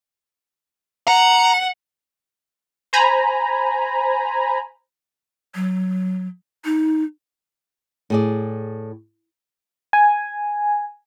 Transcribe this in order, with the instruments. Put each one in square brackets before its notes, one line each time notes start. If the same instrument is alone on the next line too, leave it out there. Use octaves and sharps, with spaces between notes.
[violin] F#5 [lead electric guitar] A#5
[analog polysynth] C5 G#5 A#5 B5
[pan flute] F#3
D#4
[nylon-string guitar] A2 G#4 D5
[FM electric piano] G#5